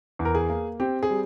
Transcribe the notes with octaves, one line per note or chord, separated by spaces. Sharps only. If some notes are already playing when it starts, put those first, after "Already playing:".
E2
A#4
G#4
A#3
C4 G4
G#4
G3